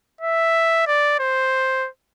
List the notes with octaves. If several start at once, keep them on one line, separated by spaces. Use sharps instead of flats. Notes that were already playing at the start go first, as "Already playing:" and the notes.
E5
D5
C5